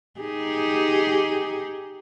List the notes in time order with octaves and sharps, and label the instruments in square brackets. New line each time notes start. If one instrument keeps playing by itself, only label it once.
[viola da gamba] D#4 G4 G#4